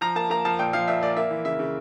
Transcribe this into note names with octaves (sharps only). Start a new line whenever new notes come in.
F3 A#5
A#3 A5
A#3 A#5
F3 A5
A#2 G5
F3 F5
A#2 E5
A#2 D5
A#3 E5
E3
C#3 E5
C#3